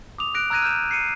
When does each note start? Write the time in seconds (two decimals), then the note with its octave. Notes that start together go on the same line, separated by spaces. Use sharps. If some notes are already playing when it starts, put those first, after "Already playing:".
0.18 D6 D#6 F7
0.34 F#6 A#6 D7
0.50 A#5 E6 F#6 G#6 A#6 D#7
0.62 F6 G6 E7
0.91 C7 C#7 D#7